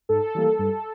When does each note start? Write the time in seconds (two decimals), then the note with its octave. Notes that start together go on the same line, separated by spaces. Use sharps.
0.09 G#2 A4
0.35 E3 G3 A#3
0.59 G2